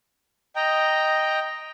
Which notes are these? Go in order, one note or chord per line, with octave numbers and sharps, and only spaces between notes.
D#5 G5 A#5